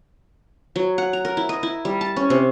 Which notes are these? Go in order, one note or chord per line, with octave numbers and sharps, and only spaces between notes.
F#3
F#5
A#5
A#4
E4
D#5
E4
G3
A5
C#4
C3